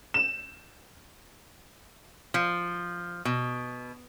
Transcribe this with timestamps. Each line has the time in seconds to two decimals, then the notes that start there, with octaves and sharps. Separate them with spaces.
0.14 E7
2.34 F3
3.25 B2